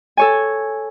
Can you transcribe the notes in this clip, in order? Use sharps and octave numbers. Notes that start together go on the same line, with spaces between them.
A4 C#5 G#5